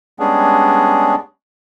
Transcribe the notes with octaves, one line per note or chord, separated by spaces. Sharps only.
G3 G#3 B3 C#4 D4 G#4